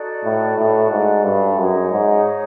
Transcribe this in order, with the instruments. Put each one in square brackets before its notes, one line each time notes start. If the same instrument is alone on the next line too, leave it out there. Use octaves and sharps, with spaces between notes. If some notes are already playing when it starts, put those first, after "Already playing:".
Already playing: [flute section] D#4 F#4 A4 D5
[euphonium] A2
A2
G#2
G2
[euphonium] F#2 [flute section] D#4 G#4 C#5
[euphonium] G#2